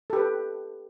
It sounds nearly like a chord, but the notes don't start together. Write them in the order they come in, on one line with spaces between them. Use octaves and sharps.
A4 G4 B4